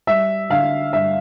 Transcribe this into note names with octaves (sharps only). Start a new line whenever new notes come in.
G3 E5
D3 F5
G2 E5